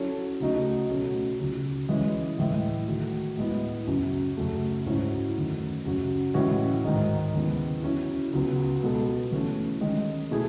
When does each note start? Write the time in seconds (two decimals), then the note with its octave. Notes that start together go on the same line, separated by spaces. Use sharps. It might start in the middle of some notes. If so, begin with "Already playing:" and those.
Already playing: F#3 C#4 E4 A4 C#5
0.40 C#3 F#3 A3 D#4 F#4
0.90 B2 F#3 A3 C#4
1.39 C#2 C#3 F#3
1.89 E3 G#3 C#4
2.39 A2 E3 G#3
2.88 D#3 F#3 A3
3.37 A2 G#3 B3 E4
3.87 F#2 C#3 F#3
4.37 F#2 C#3 F#3 A3
4.86 G#2 F#3 C#4 E4
5.36 F#2 D#3 A3
5.85 F#2 C#3 F#3 C#4 F#4
6.34 A2 E3 G#3 C#4 F#4
6.84 G#2 D#3 G#3 D#4
7.34 D#2 C#3 G#3 B3 E4
7.83 F#3 C#4 E4
8.33 C#2 C#3 F#3 B3
8.83 B2 G#3 B3 F#4 A4
9.32 E3 A3 C#4 F#4
9.81 D#3 G#3 C#4
10.31 B2 A3 E4 G#4